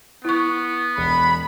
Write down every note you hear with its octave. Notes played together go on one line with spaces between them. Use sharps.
B3 E4 C#6
E1 B5